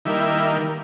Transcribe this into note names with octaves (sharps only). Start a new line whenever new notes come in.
D#3 G3 A#3 E4